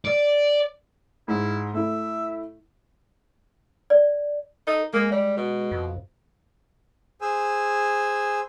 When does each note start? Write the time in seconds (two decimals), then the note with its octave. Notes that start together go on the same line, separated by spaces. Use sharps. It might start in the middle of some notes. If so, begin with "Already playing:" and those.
0.05 D5
1.28 G#2 E4
1.74 A3 E4 E5
3.90 D5
4.67 D#4 A4
4.93 G#3 A#3
5.12 G3
5.37 B2
5.71 F2
7.21 G#4 C5 G#5 E6